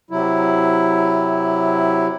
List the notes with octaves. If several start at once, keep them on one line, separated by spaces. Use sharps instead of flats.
C3 F#3 E4